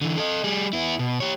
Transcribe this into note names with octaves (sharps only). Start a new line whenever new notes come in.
D3 E3
A4 D#5
G3 G#4
B3 E4
B2
G4 C#5